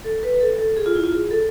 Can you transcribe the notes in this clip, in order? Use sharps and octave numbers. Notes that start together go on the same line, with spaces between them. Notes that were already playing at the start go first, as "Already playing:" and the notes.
A4
B4
A4
A4
G#4
F4
E4
F4
G#4
A4